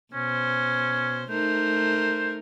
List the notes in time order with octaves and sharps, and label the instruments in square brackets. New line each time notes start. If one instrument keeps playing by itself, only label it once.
[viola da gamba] B2 C5 [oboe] C#4
[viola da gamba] A3 D#4 A#4 [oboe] C5